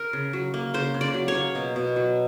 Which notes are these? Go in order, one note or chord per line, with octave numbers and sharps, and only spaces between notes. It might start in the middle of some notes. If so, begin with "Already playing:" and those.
Already playing: A#4
C#3
F#3
A#3
C#3 C5
C#3
D5
F#3
C#5
A#3
B2
B2
F#3